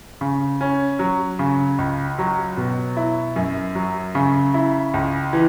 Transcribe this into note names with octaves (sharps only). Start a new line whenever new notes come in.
C#3
C#4
F#3
C#3
C#2
F#3
B2
E4
F#2
F#3
C#3
E4
C#2
E3